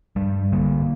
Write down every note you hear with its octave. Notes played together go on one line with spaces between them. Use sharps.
G2 G3
D3 A#3